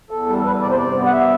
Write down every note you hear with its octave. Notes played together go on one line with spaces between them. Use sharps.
E2 A4
G3
E2 B4
C3 D5
C5
G2 D5
B3
F#5
G2 E5